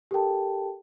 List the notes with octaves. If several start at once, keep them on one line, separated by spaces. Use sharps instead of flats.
G4 A4 A#4 G5 A5